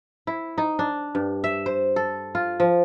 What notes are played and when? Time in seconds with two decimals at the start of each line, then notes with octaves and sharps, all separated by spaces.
0.27 E4
0.58 D#4
0.79 D4
1.15 G2
1.44 E5
1.66 C5
1.96 A4
2.35 F4
2.60 F3